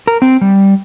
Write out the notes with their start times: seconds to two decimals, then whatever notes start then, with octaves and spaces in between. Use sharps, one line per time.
0.07 A#4
0.22 C4
0.41 G3